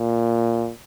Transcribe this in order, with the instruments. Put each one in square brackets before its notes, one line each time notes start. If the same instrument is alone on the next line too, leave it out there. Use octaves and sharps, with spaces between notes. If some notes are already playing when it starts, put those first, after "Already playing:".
Already playing: [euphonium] A#2